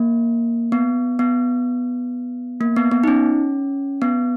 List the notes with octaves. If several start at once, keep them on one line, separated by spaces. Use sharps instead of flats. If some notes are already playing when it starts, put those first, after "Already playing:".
Already playing: A#3
B3
B3
A#3
B3
B3
D#4
C#4
B3